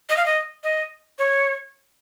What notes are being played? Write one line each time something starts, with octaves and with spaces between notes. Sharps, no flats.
D#5
F5
D#5
D#5
C#5